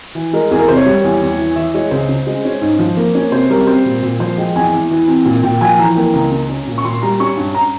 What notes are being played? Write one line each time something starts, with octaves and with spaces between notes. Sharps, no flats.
E3
G#3 A#4
E2 G#4
A#4
C3 C5
C#5
G3
E2
E2
E3
E3 E5
G#3 C#5
C#2 C5
C#3
G#3
C#4
G#2
F3
A#3
C#4
C3 C5
G3 A#4
C4 C5
A#2
A#2
F3 C5
G#3 G5
E2 G#5
E2
E3
C4
A#2
A#2 G5
F3 G#5
E3 A#5
A#3 G5
C#2 A#5
C#3
C#4
A#2
C#6
A#2 C6
G3 A#5
C#4 C#6
G2
A#5